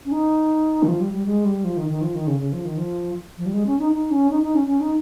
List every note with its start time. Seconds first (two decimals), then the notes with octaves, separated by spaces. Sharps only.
0.05 C#4
0.11 D#4
0.83 D#3
0.88 F3
1.00 G3
1.13 G3
1.26 G#3
1.45 G3
1.64 F3
1.77 D#3
1.89 D#3
2.01 F3
2.15 D#3
2.27 C#3
2.40 C#3
2.52 F3
2.65 D#3
2.77 F3
3.38 F3
3.46 G3
3.54 G#3
3.66 C#4
3.79 D#4
3.92 D#4
4.11 C#4
4.30 D#4
4.42 D#4
4.55 C#4
4.67 C#4
4.80 D#4